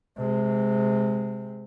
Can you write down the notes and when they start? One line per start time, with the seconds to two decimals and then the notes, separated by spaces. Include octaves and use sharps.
0.17 C3 G#3